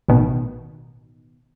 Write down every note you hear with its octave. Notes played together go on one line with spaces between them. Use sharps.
A1 B2 D#3